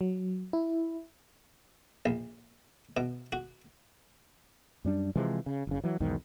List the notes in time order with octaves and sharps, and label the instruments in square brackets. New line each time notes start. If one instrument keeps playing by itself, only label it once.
[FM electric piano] F#3
E4
[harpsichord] A#1
B2
F#4
[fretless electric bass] F#2 G3 D4
C3 E3 F3 G#3
C#3
F#1 C#3
E3 F#3
B1 E2 G#2 D#3